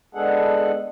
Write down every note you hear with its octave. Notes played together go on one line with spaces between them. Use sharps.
G#3 B3 D4 G#4 A4 F#5